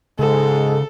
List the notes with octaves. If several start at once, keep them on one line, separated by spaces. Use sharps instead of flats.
G#2 C#3 G#3 A4